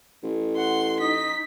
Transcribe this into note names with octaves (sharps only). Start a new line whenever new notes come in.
A1
F#5 C6
D#4 D#5 B6